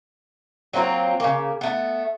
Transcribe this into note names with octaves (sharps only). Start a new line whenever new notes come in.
F#3 A#3 C4 F4
C#3 A#3
A3 B3